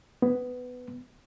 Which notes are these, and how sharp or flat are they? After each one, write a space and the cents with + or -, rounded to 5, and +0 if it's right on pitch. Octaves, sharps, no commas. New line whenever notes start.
B3 +15